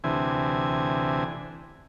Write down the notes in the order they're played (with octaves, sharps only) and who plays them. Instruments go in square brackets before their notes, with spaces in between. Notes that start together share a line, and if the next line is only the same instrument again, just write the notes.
[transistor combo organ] D2 C3 E3 G#5